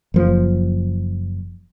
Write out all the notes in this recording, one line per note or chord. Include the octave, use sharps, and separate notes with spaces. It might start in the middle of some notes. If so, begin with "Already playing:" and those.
F#1 F3